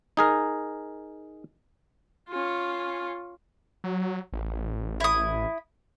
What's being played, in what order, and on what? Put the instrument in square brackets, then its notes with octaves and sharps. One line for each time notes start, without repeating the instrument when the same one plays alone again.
[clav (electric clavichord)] D#4 G#4 A#4
[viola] C#4 F4
[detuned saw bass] F#3
A1
[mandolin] E4 D#6